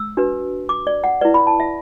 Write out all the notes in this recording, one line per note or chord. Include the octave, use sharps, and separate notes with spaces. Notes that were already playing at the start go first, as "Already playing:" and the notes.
Already playing: E6
D4 F#4 B4
D6
D5
F#5
E4 B4 D5
B5
A5
E5